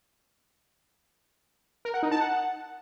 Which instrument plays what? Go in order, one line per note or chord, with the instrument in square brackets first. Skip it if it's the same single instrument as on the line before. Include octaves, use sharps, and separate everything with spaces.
[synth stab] A#4
F#5
D#4
A5
F#5